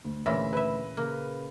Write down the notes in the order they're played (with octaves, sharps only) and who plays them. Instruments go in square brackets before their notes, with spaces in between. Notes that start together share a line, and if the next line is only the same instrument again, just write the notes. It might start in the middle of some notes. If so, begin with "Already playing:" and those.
[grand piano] D2
[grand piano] D2 A#6 [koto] A#2 C#3 E3 [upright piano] E5
[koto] E4 E5 [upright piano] B4
[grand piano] C#3 [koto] A#3